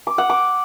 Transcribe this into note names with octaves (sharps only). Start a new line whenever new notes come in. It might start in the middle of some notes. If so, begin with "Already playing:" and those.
D6
F#5
D6